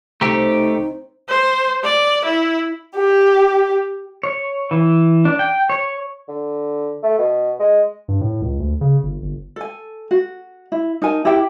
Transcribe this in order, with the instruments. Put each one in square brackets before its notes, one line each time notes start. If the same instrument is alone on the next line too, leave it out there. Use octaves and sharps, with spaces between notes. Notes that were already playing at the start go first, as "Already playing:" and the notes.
[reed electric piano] C2 A#5 [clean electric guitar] A3 G4 [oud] C4 [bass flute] D#4
[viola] C5
D5
E4
[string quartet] G4
[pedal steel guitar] C#5
E3
D4
G5
C#5
[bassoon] D3
A3
B2
G#3
[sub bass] G2
A2
C#2
D2
C#3
G1
G1
[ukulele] A4 G#5
F#4
E4
D#4 A#4 G#5 A5
E4 G4 E5 G5